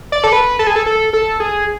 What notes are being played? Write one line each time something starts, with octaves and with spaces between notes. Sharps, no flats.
D5
A4
B4
A4
G#4
A4
A4
A4
G#4